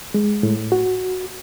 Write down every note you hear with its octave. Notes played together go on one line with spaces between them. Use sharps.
G#3
A2
F#4